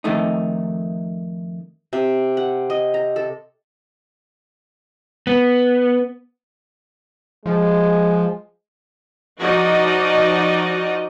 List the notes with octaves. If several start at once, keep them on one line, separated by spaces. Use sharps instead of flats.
F2 D#3 A3 D#4
C3
F#5
D#5
A#5
A4
B3
F3 G#3
F3 D#4 F#4 D5 D#5